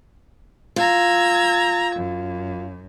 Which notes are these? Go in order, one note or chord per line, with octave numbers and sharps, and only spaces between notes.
F4 A#5 E6 G#6
F#2